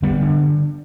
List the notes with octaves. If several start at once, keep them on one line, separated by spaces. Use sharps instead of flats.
D3 G3 B3
D3